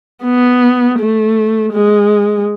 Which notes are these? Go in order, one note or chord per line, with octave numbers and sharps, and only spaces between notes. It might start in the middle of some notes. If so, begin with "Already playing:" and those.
B3
A3
G#3